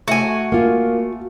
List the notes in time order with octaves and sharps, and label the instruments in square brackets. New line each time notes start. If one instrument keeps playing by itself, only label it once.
[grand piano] A3 [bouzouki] F#4 G#5
[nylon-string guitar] A#3 F4